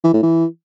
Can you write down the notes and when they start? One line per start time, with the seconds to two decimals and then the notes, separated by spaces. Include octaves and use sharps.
0.04 E3
0.14 A2
0.23 E3